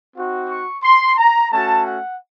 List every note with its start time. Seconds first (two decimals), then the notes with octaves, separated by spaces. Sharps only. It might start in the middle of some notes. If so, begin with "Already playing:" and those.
0.15 C4 D#4 F#4
0.50 C#6
0.83 C6
1.17 A#5
1.52 A3 C#4 F#4 A5
1.84 F#5